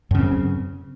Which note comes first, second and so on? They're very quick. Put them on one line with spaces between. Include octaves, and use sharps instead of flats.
F#2 C#3 C4